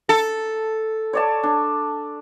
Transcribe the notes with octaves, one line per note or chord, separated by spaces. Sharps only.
A4
C#5 D5 A5
D4